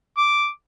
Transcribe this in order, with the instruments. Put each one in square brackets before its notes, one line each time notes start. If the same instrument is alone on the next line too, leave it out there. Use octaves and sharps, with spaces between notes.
[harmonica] D6